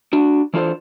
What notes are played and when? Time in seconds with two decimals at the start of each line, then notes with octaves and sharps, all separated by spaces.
0.13 D4 F#4
0.54 E3 D4 F4 A4 B4 C5